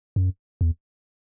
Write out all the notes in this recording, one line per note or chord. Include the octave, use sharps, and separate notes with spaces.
F#2
E2